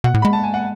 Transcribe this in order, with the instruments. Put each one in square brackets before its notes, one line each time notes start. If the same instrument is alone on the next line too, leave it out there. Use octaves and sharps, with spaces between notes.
[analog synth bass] B2 [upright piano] F#5
[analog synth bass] A2
[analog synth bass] G#3 [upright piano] B5
[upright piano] A5
G#5
F#5